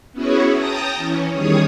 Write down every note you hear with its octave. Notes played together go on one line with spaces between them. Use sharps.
B3 C#4 E4 F#4 G#4 C#5
G5 A5 A#5 D#6 A#6
E3 C#4
E2 D#3 G3 G#4 C#5 D#6